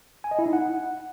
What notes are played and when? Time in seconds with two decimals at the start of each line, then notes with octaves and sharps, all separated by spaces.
0.24 G#5
0.31 D#5
0.39 E4
0.46 D#4
0.53 F#5